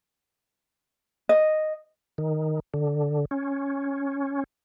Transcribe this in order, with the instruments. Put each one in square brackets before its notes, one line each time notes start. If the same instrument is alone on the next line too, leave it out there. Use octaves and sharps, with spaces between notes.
[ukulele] D#5
[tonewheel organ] D#3
D3
C#4